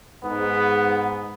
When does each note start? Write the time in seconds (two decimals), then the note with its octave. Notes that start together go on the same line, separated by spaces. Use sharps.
0.24 G#2 B3